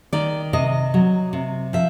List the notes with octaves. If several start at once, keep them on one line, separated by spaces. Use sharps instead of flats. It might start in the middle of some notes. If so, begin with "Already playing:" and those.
D#3 D5
C3 D#5
F#3
C3
F3 E5